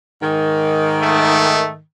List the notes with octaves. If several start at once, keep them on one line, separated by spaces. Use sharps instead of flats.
G#2 D#3
A3